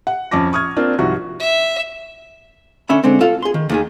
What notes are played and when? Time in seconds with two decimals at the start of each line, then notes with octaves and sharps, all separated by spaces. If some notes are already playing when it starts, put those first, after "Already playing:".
0.07 F#5
0.31 F2 C#4 A5 D6 A#6
0.53 C#6 D#6 F6 G#6
0.76 A#3 C4 D4 F4
0.99 C2 G#2 F3 F#4 C#6
1.40 E5
2.89 D3 C#4 E5 B5
3.04 D3 G#3 C4
3.21 F4 A4 F5
3.42 G#4 C6
3.54 D#3
3.69 D#2 D#3 G#4